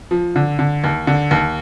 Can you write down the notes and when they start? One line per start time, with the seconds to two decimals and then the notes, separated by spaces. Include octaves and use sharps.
0.11 F3
0.36 D3
0.59 D3
0.84 D#2
1.07 D3
1.31 D#2